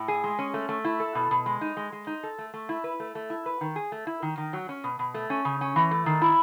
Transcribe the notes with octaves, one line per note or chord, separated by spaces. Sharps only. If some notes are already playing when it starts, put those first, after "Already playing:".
Already playing: A2
G#4
G#3
C#4
A3
A3
E4
A4
B2
B2
G#3
D#4
G#3
G#3
D#4
A4
A3
A3
E4
B4
A3
A3
E4
B4
D#3
G#4
A3
E4
D#3
D#3
F#3
C#4
B2
B2
A3
C#4
C#3
C#4
E3
A3
D#3
E4